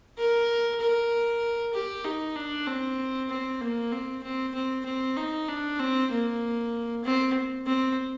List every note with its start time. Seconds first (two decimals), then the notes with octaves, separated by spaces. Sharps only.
0.17 A#4
0.80 A#4
1.73 G4
2.05 D#4
2.36 D4
2.67 C4
3.29 C4
3.61 A#3
3.92 C4
4.23 C4
4.54 C4
4.85 C4
5.16 D#4
5.48 D4
5.79 C4
6.11 A#3
7.04 C4
7.67 C4